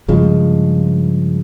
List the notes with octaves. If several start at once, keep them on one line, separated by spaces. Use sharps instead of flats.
G2 C#3 F3 G#3